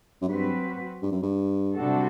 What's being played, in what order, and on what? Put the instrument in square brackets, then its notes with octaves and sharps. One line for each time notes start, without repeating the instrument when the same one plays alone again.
[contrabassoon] F#2
[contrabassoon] G2 [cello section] F#3 C4 F#4 B4
[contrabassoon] G2
F#2
G2
[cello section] C3 G3 D4 F#4 A4